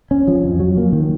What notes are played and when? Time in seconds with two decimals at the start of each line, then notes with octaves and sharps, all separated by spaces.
0.11 C#4
0.27 F3
0.44 F2
0.60 F#3
0.77 A#3
0.93 D#3